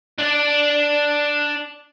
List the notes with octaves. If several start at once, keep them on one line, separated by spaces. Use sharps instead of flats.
D4 D5